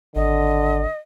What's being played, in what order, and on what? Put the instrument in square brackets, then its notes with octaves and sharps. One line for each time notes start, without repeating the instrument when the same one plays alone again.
[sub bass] G#1 [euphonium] D3 [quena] D#5